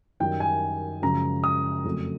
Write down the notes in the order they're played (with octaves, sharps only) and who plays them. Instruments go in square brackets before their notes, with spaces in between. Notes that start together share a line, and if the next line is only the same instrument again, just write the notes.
[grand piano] F#2 D#3 G3 G5
G#5
F#2 C#3 F3 G#3 A#5
D#6
F2 C#3 F#3 A3